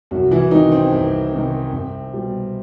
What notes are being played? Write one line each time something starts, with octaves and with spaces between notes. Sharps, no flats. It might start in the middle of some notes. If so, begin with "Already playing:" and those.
C2 F#3 F#4
E3 E4
C3 D#3 D#4
C4
C2
C3 D#3
C2
B2 G3